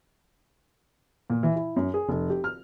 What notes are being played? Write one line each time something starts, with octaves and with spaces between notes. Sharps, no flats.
A#2
E3
E4
F#2
G#4
F1
G4
F6